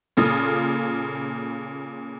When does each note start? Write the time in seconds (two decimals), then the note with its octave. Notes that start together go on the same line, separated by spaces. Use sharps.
0.17 A#2 C#3 F4 A4 D#6